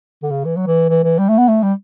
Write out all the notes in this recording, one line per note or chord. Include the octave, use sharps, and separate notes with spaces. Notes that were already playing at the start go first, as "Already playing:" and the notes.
D3
C#3
E3
F#3
E3
E3
E3
G3
A3
B3
A3
G3